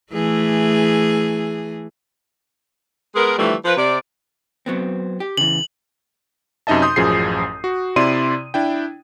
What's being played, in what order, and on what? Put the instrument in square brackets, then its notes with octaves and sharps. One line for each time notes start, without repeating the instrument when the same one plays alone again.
[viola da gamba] E3 A3 G#4
[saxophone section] G#3 B3 G#4 A#4
D3 E3 F3 G3 A3
F3 B4
C3 D5
[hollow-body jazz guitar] F#3 B3 C4
G4
[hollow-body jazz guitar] C#3 E3 [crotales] F#7
[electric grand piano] F#2 C3 D#4 D#5 E5 A5
C6 D#6 G6
A1 F#2 F3 G#4 C7
F#4
C3 E4 D5 C6 D#7
D4 E4 G5